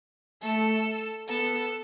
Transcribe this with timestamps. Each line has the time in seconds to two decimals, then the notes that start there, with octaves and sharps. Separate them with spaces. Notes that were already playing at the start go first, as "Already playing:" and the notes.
0.42 A3 A4
1.29 B3 A4